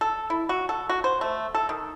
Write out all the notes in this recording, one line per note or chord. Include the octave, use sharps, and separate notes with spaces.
A4
E4
F#4
A4
F#4
C5
A3
A4
D#3